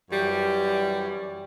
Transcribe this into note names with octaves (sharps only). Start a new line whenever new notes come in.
F#2 E3 G3